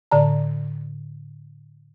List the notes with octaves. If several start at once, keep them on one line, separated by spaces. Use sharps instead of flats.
A2 D3 D5 A5 A#5